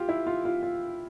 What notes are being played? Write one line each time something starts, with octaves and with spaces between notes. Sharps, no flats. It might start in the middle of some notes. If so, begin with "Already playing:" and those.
Already playing: F4 G4
E4
F4
F4
F4